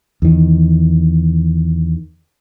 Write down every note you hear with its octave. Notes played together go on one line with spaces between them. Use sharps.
E2 D#3